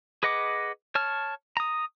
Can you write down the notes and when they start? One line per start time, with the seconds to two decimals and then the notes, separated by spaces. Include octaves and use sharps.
0.23 G#4 B4 D#5 F#5 D6
0.95 C#5 A5 F6
1.57 A#5 D#6